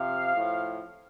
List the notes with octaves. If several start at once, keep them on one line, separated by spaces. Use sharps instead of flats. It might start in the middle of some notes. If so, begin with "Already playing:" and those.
Already playing: C3 F3 F5
A2 F3